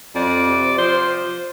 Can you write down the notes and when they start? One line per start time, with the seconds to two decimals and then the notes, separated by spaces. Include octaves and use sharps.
0.14 F2 D5
0.46 C3
0.78 F3 C5